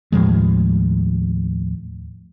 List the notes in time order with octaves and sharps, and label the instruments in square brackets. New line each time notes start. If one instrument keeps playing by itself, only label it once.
[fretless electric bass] D#2 A2 F3 G#3